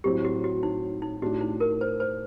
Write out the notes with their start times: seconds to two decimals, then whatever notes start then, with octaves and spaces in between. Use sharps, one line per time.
0.04 A2 F#3 A3 C4 G4
0.25 F#4
0.44 F#4
0.63 D#4
1.02 D#4
1.22 A2 A3 D4 F#4 G4
1.41 D#4
1.60 A#4
1.81 C5
2.00 C5